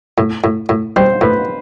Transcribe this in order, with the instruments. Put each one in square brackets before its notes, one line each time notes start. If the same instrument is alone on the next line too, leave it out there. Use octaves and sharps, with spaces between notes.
[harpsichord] A2
A2
A2
[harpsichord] G3 [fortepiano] C5
[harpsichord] A2 [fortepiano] B4